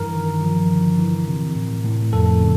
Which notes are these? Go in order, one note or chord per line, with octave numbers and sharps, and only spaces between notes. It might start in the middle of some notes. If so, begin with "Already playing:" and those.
Already playing: G2 E3 A#4
D#3
F3
D3
E3
C3
A2
A2
F2 A4
C#3